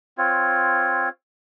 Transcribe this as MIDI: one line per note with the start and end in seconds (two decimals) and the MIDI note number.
0.18 1.09 60
0.18 1.09 65
0.18 1.09 73